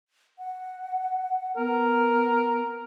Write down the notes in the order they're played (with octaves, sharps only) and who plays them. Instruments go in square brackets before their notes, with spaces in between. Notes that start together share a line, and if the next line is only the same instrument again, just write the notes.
[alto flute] F#5
[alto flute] B3 [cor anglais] A#4